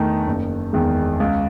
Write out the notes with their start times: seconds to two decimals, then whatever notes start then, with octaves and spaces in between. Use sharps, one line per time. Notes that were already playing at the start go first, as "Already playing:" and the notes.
Already playing: E2 D#3 A3 D#4
0.27 F#1
0.73 E2 D#3 G#3
1.20 C#2